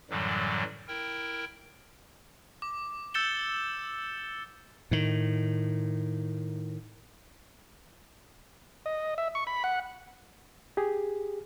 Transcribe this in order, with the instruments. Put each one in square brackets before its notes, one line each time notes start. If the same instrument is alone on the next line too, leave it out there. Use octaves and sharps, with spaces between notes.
[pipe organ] F#2 A2 D3 E3 F#3 G3
E4 A#4 G5
[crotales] D6
E6 G6 A6 C#7 E7 G7
[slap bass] A2 D#3
[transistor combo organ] D#5
E5
C#6
B5
F#5
[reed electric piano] G4 G#4